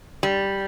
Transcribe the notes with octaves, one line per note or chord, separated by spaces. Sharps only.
G3